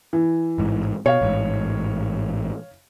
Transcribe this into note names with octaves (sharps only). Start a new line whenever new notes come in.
E3
A1 G#2
B2 C#5 F5
A1 G#2